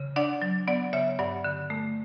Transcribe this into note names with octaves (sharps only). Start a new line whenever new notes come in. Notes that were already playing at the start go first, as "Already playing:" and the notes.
Already playing: C#3
D4 D5 F#5
F#3
B3 D5 F#5
C#3 C#5 E5
G2 D5 F#5
D3
A3